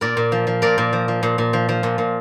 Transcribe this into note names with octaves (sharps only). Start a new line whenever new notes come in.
A#2 A#4 D5
A#2
F3
F3
A#2 A#4 D5
A#2
F3
F3
A#2
A#2
F3
F3
A#2
A#2